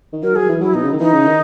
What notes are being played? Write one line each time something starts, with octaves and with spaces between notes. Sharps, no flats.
D#3
F#3 A#4
F#3 G#4
E3
F#3 E4
B2 D#4
C#3
D#3
E3 D#4
C#3
D#3